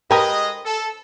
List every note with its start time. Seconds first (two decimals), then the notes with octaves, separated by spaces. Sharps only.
0.11 G#3 G4 A#4 B4 D#5
0.65 A4